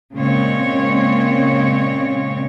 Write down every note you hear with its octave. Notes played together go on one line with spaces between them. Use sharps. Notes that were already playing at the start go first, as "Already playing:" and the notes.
A#2 C#3 G#3 C4 C#5